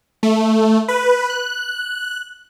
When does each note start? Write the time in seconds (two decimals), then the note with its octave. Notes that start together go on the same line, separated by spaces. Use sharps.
0.23 A3
0.88 B4
1.30 F#6